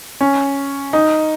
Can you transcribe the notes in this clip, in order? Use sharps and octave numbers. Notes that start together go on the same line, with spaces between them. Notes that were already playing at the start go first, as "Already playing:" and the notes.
C#4
D#4